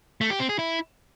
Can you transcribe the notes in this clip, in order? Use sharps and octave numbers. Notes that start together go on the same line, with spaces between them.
A3
G4
C4
G#4
E4